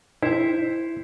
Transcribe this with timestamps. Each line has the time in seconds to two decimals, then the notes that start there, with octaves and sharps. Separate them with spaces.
0.23 E4 C5 E5